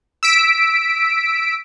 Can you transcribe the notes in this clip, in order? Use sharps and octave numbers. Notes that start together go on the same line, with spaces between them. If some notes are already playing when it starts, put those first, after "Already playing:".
E6 B6 D7